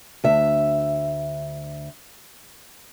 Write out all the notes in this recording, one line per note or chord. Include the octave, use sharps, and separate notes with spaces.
D2 E5